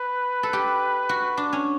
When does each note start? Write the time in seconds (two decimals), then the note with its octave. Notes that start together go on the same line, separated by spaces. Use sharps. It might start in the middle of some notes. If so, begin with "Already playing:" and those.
Already playing: B4
0.43 A4
0.53 G4
1.09 F#4
1.37 D4
1.53 C#4